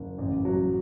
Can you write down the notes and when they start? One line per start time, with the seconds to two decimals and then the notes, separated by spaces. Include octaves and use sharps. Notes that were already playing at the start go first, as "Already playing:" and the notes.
Already playing: F#1
0.18 A1
0.45 F#3